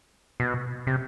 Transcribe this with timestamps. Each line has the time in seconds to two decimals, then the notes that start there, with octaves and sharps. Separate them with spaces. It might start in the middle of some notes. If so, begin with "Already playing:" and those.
0.40 B2
0.87 C3